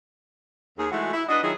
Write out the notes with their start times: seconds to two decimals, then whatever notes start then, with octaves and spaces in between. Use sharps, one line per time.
0.78 D#2 G#4
0.91 E3 G#3 A3 F#4
1.13 E4
1.28 D4 F#4 B4 D#5
1.42 D#3 F#3 E4 F4 G#4